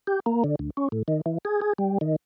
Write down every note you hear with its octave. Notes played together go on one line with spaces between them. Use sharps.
G4
A#3
D3
D2
C#4
A2
D#3
E3
G#4
G#4
G3
D#3